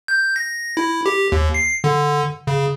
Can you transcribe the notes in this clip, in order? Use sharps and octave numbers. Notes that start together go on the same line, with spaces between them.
G6
A#6
E4
G4
D#2
C7
D3
C#3